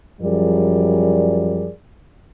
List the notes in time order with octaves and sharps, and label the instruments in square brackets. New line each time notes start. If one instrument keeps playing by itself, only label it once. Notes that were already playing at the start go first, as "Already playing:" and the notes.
[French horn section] F#2 F3 G3 G#4 A#4 D5